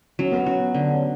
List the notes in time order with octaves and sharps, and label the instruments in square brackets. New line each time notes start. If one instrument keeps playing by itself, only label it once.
[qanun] F#3 [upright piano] C#4
[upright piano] B3
[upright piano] C#4 [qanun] F#4
[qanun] D3
[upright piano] C#4